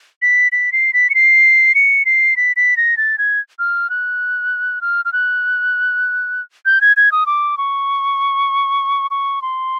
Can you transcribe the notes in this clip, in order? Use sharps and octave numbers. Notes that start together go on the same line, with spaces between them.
B6
B6
C7
B6
C#7
C7
C#7
C7
B6
B6
A#6
A6
G#6
F6
F#6
F6
F6
F#6
G6
G#6
G#6
D#6
D6
C#6
C#6
C6